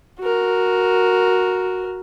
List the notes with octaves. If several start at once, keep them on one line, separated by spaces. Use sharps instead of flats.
F#4 A#4